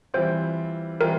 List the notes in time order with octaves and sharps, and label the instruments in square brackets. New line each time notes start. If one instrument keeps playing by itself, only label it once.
[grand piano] E3 G3 C4 F4 [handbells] C5
[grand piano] E3 G3 C4 F4 [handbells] A#4